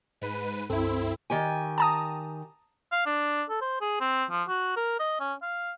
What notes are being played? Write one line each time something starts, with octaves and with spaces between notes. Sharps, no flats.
G#2 B4 D#7
C#2 G2 C4 E4 A4
D#3 G4 G#5
A5 A#5 D#6
F5
D4
A4
C5
G#4
C4
F3
F#4
A#4
D#5
C#4
F5